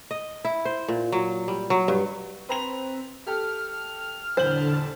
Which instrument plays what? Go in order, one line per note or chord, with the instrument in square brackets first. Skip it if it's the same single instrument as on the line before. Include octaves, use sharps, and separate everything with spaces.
[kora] D#5
E4
C5
A#2
F#3
G3
F#3
G2
[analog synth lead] C4 [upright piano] B4 A#5 F7
[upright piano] G4 A4 [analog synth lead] F6
[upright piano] D#1 E2 F#7 [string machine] D3 A5 [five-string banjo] C5